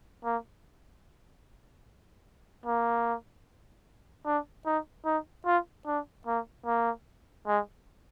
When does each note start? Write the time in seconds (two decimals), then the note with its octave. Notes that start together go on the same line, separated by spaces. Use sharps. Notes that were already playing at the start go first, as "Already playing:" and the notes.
0.25 A#3
2.66 A#3
4.26 D4
4.66 D#4
5.05 D#4
5.46 F4
5.87 D4
6.27 A#3
6.66 A#3
7.47 G#3